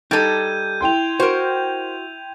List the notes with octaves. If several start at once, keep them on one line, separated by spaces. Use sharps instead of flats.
G3 D#4 A4 G6 G#6 D#7
E4 G5 C6 G6 F7
F#4 A#4 C5